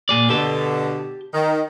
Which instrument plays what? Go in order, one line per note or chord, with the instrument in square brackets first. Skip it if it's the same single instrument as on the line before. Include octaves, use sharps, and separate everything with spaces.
[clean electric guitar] A#2 G#4 D5
[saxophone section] B2 D3 [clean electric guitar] G4 A5
[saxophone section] D#3